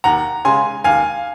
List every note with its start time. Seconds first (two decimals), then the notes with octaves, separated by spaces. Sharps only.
0.04 D#2 F#5 A#5
0.45 C#3 G#3 G#5 C6
0.84 D#2 F5 G#5